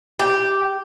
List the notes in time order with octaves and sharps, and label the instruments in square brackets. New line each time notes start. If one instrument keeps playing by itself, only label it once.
[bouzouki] G4